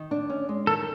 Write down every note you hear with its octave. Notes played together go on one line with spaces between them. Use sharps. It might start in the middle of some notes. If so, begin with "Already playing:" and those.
Already playing: D#3
D4
C#4
G#3
D#3 A4